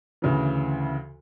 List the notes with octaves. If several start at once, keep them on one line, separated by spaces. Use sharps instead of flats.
D2 C#3 E3